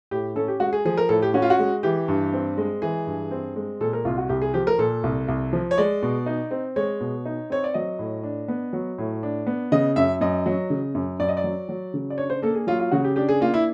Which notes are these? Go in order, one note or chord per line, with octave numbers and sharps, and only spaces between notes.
A2 G4
C#4 A4
G4
G#3 F#4
G#4
F3 G#4
A#4
A2 A4
G4
C#4 F#4
F4
F#4
G#3
E3 G4
G2
C4
G#3
E3 G#4
G2
C4
G#3
A#2 A4
A#4
C2 F4
F#4
C2 G4
G#4
F3 G4
A#4
A#2 A4
C2
C2
F3
C#5
G#3 D5
B2
D#4
C4
G#3 C#5
B2
D#4
C4 C#5
D5
F#3 D#5
A2
D4
B3
F#3
A2
D4
B3
C#3 D#5
F#2 E5
F#2 D#5
F#3
C#3
F#2
F#2 D5
D#5
D5
F#3
F#3
C#3
D5
D4 C#5
C5
A#3 A4
G#4
F#3 F4
F4
C#3 F#4
G4
D4 G4
G#4
A#3 F4
E4